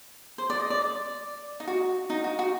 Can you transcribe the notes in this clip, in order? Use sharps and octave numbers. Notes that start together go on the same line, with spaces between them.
C5
D5
D#5
D5
D5
D#4
F#4
D#4
F#4
F#4